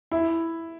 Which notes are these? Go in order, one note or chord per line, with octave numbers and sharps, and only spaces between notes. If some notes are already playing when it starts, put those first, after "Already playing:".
E4